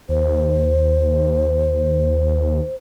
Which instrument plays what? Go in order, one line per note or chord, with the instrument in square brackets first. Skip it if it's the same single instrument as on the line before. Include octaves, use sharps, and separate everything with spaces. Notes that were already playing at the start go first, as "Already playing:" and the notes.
[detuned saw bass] D#2 [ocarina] C5